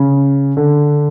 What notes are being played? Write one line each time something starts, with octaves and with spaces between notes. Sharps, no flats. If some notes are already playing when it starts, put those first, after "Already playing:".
Already playing: C#3
D3